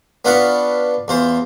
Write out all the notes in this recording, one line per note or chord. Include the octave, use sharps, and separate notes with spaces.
B3 D4 F4 B4 F5 C#6
E2 F4 C5